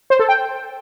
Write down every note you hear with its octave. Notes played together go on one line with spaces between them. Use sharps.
C5
A4
G5